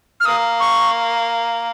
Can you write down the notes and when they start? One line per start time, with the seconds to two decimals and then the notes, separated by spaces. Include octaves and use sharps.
0.20 F6
0.25 A#3 D#6
0.60 C#6